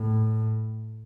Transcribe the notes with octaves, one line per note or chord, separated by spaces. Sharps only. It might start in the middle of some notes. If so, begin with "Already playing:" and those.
Already playing: A2